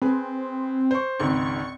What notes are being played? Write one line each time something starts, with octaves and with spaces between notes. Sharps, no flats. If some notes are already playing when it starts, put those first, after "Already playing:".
C4 G#4 B4
C5 C#6
G#1 C#2 G#2 C#6